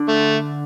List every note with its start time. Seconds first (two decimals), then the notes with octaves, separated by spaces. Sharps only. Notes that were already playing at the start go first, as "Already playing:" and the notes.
Already playing: D3
0.09 A3